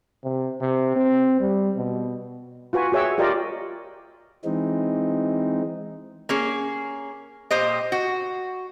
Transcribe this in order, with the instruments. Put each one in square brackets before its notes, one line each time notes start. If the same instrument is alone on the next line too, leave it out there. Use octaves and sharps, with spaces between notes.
[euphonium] C3
C3
C4
G3
B2
[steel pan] F4 F#4 B4 G#5
F#4 G#4 C#5 E5 G5 E6
F4 G4 A#4 D5 D#5
[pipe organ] E3 G#3 C4 D#4
[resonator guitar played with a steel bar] A#3 C#4 G#4
A#2 G4 C5 D#5
F#4